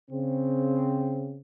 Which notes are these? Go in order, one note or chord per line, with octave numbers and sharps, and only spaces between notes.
C#3 C4